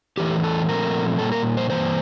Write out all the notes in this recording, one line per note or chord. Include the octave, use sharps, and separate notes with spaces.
E2 E3 A3 G4
A4
A#2 F3 A3 C4 A#4
A#2 G3 A#3 A4
A#4
C5
G2 E3 A#3 C5